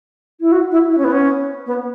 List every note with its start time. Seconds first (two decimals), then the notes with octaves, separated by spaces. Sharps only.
0.40 E4
0.52 F#4
0.71 E4
0.90 E4
0.98 C#4
1.04 B3
1.12 C#4
1.66 B3